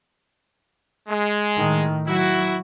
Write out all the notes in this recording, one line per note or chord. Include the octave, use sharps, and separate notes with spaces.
G#3
A2 D#3
F#3 E4 F#4